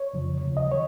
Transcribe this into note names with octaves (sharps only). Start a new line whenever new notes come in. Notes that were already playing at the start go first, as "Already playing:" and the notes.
Already playing: C#5
F2 C#3 F3
D#2 C#3 F3
D#5
D#3 C#5